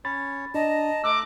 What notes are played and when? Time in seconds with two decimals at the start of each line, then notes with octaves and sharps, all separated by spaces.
0.05 C#4 C#5 B5 A6
0.54 D4 D#5 A5 A#5
1.04 A3 A#5 D6 E6 F#6